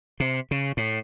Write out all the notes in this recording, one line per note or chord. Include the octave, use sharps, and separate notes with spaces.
C3
C#3
A2